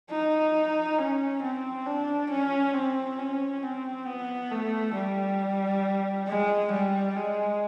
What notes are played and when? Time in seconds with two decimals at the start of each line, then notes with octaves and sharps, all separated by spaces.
0.10 D#4
0.98 C#4
1.42 C4
1.87 D4
2.30 C#4
2.74 C4
3.19 C#4
3.62 C4
4.07 B3
4.51 A3
4.95 G3
6.28 G#3
6.72 G3
7.16 G#3